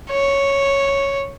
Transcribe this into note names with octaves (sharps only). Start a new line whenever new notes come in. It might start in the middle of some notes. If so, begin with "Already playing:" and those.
C#5